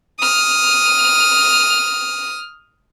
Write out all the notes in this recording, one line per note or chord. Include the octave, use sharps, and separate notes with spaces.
D#6 F6